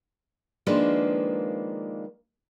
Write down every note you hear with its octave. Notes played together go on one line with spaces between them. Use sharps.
D#3 F3 G#3 A#3 D4 B4